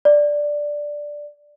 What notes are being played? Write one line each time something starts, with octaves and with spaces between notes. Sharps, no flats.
D5